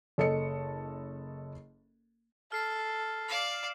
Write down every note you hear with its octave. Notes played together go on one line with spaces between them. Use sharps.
F#1 A4 D#5 C#7
A4 F6 C7
D5 F5 C7 E7